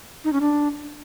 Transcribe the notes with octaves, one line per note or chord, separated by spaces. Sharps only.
D#4
C#4
D4